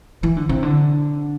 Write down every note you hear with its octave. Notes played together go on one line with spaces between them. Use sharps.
E3
D3
C3
D3